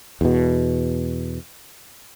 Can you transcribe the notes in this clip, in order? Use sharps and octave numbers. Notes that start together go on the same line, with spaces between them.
E2 B2